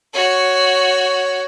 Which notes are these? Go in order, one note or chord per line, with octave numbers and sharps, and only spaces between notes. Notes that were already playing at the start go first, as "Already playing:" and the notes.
F#4 C#5